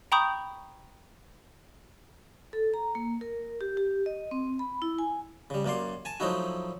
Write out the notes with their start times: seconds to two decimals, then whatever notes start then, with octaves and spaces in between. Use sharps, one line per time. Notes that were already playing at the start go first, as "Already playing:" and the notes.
0.12 G5 A#5 B5 C#6 D#6 G6
2.53 A4
2.74 A#5
2.95 A#3
3.21 A#4
3.61 G4
3.77 G4
4.06 D#5
4.31 C4
4.59 B5
4.82 E4
4.99 G#5
5.50 C#3 G3
5.65 F#2 A#3 D5 C6
6.05 G#5 A5
6.20 F3 F#3 A3 D#4 E4 F#4